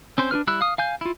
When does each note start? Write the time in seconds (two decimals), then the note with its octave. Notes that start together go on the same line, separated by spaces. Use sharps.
0.18 C4 C#4 C5
0.31 D4 F4 B4 F6
0.47 G3 E4 B5 E6 F#6
0.61 F5 D#6
0.78 F5 G#5 G6
1.01 E4 F4